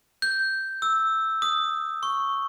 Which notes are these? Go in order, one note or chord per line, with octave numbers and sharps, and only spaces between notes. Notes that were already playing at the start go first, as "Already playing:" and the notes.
G6
E6
D#6
C#6